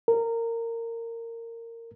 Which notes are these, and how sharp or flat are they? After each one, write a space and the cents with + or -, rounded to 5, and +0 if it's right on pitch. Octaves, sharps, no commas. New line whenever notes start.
A#4 -20